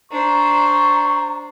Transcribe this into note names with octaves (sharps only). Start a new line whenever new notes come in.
D4 C5 A#5 C#6